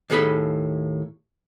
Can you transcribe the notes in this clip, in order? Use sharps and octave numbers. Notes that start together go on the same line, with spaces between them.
D#2 A2 G#4 A4 B5